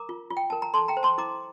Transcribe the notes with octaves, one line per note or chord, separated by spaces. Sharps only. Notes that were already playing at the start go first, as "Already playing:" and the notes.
Already playing: A#4 A#5 D6
F4
F4
G5
A#4 A5
A#5
A4 A5 C6
G5 A#5
C5
A5 C6
E4 A#5 D6